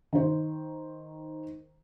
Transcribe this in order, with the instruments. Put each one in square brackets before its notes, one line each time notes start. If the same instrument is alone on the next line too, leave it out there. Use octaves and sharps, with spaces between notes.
[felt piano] D#3 C5